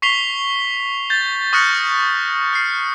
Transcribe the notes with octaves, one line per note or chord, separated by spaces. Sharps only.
C#6 B6 C7 F7 G7
G6 A6
C#6 D#6 F6 F#6 A#6 C#7
F6 C7